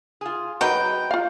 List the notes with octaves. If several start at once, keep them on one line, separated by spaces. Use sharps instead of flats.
F4 G#4
F#3 D#4 B4 G5
F4 F5